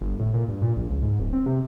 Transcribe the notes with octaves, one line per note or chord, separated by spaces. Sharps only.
G1
A2
A#2
G2
A#2
A#1
C#2
G#2
D1
C4
C3